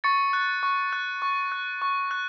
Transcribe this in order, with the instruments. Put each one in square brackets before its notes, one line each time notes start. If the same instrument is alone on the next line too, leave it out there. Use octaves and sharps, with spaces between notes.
[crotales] C#6 A6 C#7
F#6
C#6
F#6
C#6
F#6
C#6
F#6